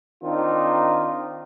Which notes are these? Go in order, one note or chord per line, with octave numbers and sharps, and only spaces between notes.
D#3 C4 D4 D#4 F4